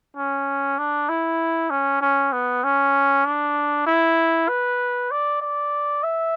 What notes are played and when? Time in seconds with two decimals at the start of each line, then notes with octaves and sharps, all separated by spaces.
0.17 C#4
0.78 D4
1.09 E4
1.70 C#4
2.01 C#4
2.32 B3
2.64 C#4
3.25 D4
3.87 E4
4.48 B4
5.11 D5
5.41 D5
6.04 E5